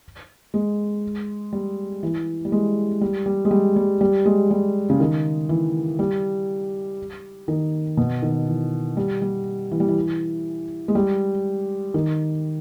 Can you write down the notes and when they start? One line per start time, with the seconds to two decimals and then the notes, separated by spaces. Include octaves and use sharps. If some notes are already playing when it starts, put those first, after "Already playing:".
0.54 G#3
1.53 G3
2.03 E3
2.45 G3
2.52 G#3
3.01 G3
3.26 G3
3.45 G#3
3.51 G3
3.76 G3
4.01 G3
4.25 G#3
4.51 G3
4.90 C#3
5.00 D#3
5.49 E3
5.99 G3
7.48 D#3
7.97 B2
8.22 D#3
8.47 E3
8.97 G3
9.22 G3
9.71 E3
9.80 G3
9.88 E3
10.88 G#3
10.95 G3
11.94 D#3